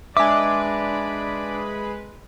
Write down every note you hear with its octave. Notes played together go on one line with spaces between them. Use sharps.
G#3 D4 B4 D5 E5 G#5 D6